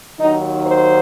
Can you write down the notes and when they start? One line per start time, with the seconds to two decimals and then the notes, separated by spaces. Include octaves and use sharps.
0.19 D#2 D#3 F#3 D#4
0.66 C5